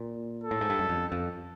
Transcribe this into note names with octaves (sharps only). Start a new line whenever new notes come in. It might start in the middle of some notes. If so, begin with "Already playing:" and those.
Already playing: A#2
A4
A2
G#2
G2
F#2
F2
F2